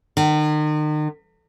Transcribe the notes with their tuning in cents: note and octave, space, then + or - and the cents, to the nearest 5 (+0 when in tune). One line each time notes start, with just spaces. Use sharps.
D#3 -40